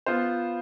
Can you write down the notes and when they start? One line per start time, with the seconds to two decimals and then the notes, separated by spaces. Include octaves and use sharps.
0.06 B3 F4 C5